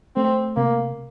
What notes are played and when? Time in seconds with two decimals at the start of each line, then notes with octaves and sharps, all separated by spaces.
0.16 A3 C4
0.56 C3 A#3